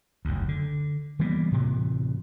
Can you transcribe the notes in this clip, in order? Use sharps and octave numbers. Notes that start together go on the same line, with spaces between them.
F#1 D2
D3
E3 G3 A#3 B3
A2 C3 E3